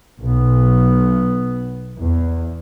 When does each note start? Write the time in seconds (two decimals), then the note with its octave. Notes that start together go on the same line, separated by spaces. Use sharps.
0.21 B1 B3
1.98 E2